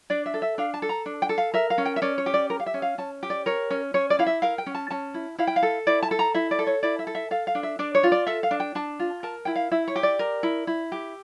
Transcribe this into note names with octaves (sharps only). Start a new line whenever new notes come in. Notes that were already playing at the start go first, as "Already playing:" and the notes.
D4 D5
E5
A4
E5
D4 F5
A5
A4
A#5
D4
G5
A4
F5
A#4 E5
F5
C#4
G5
E5
C#4 D5
C#5
G4
D5
A#4
F5
E5
C#4
F5
C#4 A5
G4
D5
A#4 C#5
C#4
C#4 C#5
D5
E4 F5
E5
A#4 F5
G5
C#4
A5
C#4 A5
E4
E4 F5
G5
F5
A4
E4 D5
A5
A4
A#5
E4 E5
D5
A4
C#5
E4 D5
E5
A4
E5
A4 F5
F5
D4
E5
D4 D5
C#5
F4
D5
A4 E5
F5
D4
G5
D4 A5
F4
A#4 A5
E4 G5
F5
E4 E5
C#5
G4
D5
A#4
E4
E4
G4